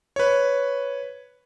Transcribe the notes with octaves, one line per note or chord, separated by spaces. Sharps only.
B4 C#5